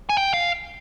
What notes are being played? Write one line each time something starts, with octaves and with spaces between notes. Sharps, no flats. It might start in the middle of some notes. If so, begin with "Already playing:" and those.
G#5
G5
F5